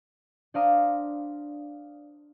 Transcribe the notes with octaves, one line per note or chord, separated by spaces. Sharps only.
D4 C5 D5 F5 A#5 D#6